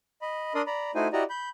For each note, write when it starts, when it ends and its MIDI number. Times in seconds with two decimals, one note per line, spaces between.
0.22 0.53 75
0.22 0.53 83
0.55 0.62 62
0.55 0.62 70
0.55 0.62 74
0.55 0.62 84
0.55 0.62 87
0.67 0.91 74
0.67 0.91 82
0.67 0.91 83
0.95 1.08 57
0.95 1.08 63
0.95 1.08 64
0.95 1.08 66
0.95 1.08 72
0.95 1.08 80
1.13 1.23 64
1.13 1.23 66
1.13 1.23 67
1.13 1.23 74
1.13 1.23 75
1.13 1.23 82
1.30 1.49 83
1.30 1.49 91